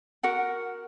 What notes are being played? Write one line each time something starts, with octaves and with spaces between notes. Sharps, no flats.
F#4 A#4 F#5